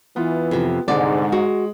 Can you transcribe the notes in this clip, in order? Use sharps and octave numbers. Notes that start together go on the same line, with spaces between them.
E3 B3 F4
F2 C3
C2 G#2 D3 G#3 D5
G#3 F#4